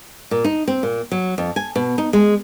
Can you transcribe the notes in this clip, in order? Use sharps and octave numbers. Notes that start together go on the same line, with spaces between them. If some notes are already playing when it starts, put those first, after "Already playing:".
A#2
D#4
C4
A#2
F#3
F2
G#5
B2
D#4
G#3